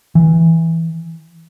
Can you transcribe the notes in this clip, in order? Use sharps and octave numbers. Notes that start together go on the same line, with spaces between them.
E3